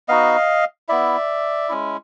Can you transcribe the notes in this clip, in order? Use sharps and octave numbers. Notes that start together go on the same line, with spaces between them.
B3 D#4 F#4 D#5 F5
B3 E4 D5 E5
G#3 C#4 E4